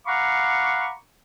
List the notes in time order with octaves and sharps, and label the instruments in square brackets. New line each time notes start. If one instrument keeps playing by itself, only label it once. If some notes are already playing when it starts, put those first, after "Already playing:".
[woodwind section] F5 F#5 A#5 B5 C#6 D6